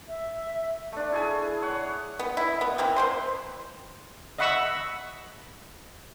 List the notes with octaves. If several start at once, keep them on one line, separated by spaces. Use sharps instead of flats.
E5
A3 D4
E4 G#4 G#5
C#5 F#5
B3
E4
B3
E3 A#3 C4
B4 C5 C6
D#5 E5 F#5 B5 C#6 E6